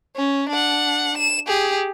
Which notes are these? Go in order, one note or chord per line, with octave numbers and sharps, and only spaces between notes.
C#4
D4 F#5
E7
G4 G#4